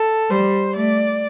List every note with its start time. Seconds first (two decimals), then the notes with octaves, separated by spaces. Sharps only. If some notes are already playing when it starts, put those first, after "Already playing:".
Already playing: A4
0.30 G3 C5
0.76 A3 D5